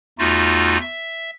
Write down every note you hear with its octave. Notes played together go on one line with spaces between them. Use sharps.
E2 A3 D#4 F4 F#4
E5